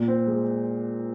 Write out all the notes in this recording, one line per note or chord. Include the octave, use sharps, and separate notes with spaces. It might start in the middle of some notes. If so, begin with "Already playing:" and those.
Already playing: A#2
C4
G#3